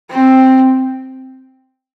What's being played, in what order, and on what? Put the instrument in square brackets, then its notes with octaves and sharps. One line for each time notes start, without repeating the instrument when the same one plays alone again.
[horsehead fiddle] C4